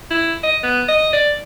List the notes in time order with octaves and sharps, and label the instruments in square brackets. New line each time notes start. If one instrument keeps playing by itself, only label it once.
[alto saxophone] E4
D#5
B3
D#5
D5